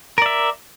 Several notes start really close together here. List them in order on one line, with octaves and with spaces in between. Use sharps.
A#4 D5 E5